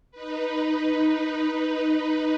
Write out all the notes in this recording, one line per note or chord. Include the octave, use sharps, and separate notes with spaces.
D#4 B4